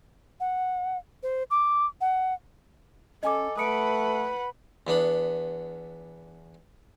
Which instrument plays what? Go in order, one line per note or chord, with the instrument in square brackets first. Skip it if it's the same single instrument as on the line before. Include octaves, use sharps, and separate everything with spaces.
[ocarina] F#5
C5
D6
F#5
[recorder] C#4 [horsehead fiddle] A4 [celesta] D#5 G#5 D6
[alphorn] A3 [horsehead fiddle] B4 F#5 [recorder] B5 [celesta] D#6 C#7 D7
[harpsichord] E2 B3 D4 B5